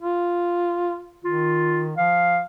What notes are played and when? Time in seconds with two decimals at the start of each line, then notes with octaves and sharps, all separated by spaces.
0.01 F4
1.24 D#3 F4
1.97 F3 F5